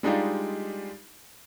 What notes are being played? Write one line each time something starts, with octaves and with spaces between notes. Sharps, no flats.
G3 G#3 D4 D#4 F4 G4